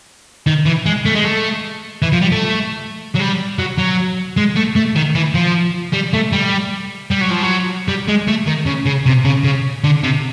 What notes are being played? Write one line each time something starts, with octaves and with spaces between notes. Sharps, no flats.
D#3
E3
G#3
A3
G#3
A3
E3
F3
G3
A3
F#3
G3
F#3
F#3
G#3
A3
A3
D#3
E3
F3
G3
A3
G3
G3
F#3
F3
F#3
G3
G#3
A3
D#3
C#3
C#3
C3
C#3
C#3
D3
C3